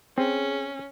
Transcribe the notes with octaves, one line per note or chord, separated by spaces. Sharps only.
C4 C#4 G#4